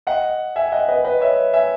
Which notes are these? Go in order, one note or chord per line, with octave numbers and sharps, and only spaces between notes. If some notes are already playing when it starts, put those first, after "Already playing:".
D#5 F#5
E5 G#5
D#5 F#5
B4 D#5
B4 D#5
C#5 E5
E5 G#5